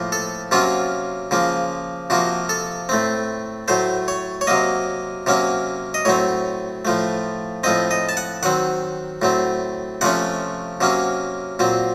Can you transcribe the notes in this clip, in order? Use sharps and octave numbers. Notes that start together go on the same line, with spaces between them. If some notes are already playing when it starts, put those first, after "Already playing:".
Already playing: A2 F3 A#3
A4
C3 F#3 A#3 C#4 F4
C#3 F3 A#3
C3 F3 A#3 F#4
A4
A2 A3 C4
A2 F#3 A3 C5
C#5
C#5
C3 F#3 A#3 D#5
C3 F#3 A#3 C#4
D#5
A2 F#3 C4 C#5
A2 F3 A3
A2 F3 C4 D#5
D#5
A5
F#5
D#3 F#3 C4 F#5
A2 F#3 C4
C3 F3 A3 C#4 F#5
C3 F#3 A#3 C#4
A#2 F#3 C4